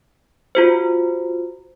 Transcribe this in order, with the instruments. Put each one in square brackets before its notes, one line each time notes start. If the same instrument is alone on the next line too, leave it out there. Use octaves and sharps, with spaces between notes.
[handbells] F4 F#4 C5